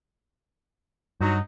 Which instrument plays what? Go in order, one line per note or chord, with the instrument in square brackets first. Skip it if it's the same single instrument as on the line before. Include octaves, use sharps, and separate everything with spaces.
[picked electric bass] G2 [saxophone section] F#3 D#4